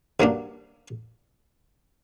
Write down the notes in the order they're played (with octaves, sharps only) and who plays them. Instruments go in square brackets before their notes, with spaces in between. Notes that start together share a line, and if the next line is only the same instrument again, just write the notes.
[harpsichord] G2 F#3 A#3 D4